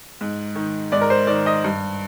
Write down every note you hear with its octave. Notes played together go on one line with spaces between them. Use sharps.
G#2
D#3
G#2 D5
A#4
C5
D#3 D5
D#5
G2